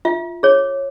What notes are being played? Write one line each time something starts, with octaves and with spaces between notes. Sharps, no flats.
F4 E5
G#4 C#5